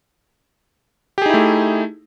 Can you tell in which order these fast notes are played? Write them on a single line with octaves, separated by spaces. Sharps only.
G4 G#4 D#4 E4 A3